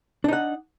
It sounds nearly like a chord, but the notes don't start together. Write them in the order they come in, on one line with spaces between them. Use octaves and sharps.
D4 D#4 F#5